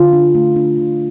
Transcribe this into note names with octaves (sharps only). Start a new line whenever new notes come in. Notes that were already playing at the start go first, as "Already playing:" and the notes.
Already playing: D3 F4
D4
A3
D4
D3